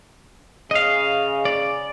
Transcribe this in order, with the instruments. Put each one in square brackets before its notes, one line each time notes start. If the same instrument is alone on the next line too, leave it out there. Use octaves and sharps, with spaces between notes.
[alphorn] C#3 [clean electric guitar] D#5 F5
[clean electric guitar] D5